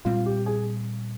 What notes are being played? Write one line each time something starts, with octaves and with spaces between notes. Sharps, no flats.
A#2 G3 C4 F4
G4
G#4